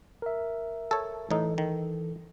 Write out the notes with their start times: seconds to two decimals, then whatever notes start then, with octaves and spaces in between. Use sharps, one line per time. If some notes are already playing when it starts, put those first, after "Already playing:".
0.22 A#4 E5
0.91 A4 C#5
1.31 A2 E3 D#4 A4
1.58 D#3